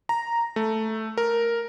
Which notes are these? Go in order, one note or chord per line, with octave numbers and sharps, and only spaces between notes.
A#5
A3
A#4